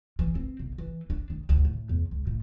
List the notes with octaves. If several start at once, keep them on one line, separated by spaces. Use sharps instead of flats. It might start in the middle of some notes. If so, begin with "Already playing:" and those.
E3
C4
B1
E3
D4
D#3
D2
A2
E2
C#2
A2